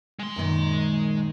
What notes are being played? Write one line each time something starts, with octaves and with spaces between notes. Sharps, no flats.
G#3 C6
F#2 A#2 D#3